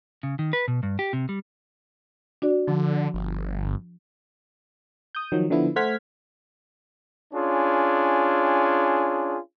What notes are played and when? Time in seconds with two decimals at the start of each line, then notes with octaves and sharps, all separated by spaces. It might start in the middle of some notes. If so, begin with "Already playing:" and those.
0.23 C#3
0.39 D#3
0.53 B4
0.68 B2
0.83 G2
0.99 G4
1.13 C3
1.29 G3
2.42 D4 F#4 D5
2.68 D3 F3
3.14 G1
5.15 D#6 G6
5.32 D#3 F3 F#3
5.50 D3 F3 B3 E4
5.76 A3 C5 F#5 F6 G#6 B6
7.33 C#4 D4 F4 G#4